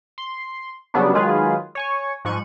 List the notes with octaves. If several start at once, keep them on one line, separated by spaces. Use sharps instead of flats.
C6
C#3 F#3 G3 B3 D4
D#3 F#3 G#3 F4 G#4 B4
C#5 G#5 C#6
G#2 F3 C#6 F#6 D#7